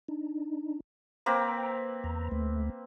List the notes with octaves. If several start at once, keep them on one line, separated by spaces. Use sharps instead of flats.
D4 D#4
A#3 C4 B4 G5 A#5
E2 A#5
D2 A3